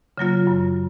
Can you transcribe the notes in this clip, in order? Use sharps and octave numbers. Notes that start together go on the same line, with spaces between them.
C#3 F#3 A#3 F4
F#2